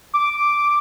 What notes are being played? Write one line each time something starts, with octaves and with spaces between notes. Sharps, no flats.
D6